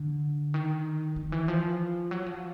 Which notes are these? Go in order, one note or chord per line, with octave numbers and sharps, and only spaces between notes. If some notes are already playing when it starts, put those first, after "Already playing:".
Already playing: D3
D#3
D#3
E3
F3
F#3
F3